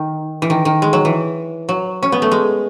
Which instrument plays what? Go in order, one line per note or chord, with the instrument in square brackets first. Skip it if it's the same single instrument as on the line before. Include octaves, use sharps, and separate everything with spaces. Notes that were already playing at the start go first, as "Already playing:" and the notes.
Already playing: [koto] D#3
E3
D#3
D#3
G#3
F#3
E3
F#3
C#4
B3
A3
G#3